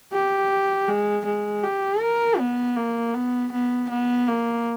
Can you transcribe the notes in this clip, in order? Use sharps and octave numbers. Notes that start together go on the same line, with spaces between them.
G4
G#3
G#3
G4
A#4
B3
A#3
B3
B3
B3
A#3